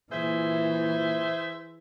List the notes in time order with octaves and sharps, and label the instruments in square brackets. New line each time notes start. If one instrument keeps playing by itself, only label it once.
[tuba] A#2 [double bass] E3 [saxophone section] G#4 C5 E5